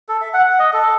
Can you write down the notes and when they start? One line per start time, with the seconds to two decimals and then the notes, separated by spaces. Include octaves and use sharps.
0.09 A4
0.21 E5
0.34 F#5
0.46 F#5
0.59 D#5
0.73 A4